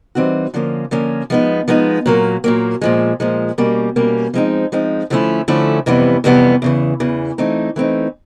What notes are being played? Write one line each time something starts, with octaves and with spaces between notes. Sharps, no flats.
E3 G3 C4 D#4 F#4
D3 F3 A#3 C#4
D3 F3 A#3 C#4
F3 G#3 B3 D#4
F3 G#3 B3 D#4
A#2 F#3 A#3
A#2 F#3 A#3
A#2 F3 G#3
A#2 F3 G#3
B2 G3 A#3 C#4
B2 G3 A#3 C#4
F3 G#3 C4 D#4
F3 G#3 C4 D#4
D3 F3 A3 C#4 E4
D3 F3 A3 C#4 E4
F2 C3 E3 G3 B3
F2 C3 E3 G3 B3
E2 C#3 E3
E2 C#3 E3
E3 A3 C4 D#4
E3 A3 C4 D#4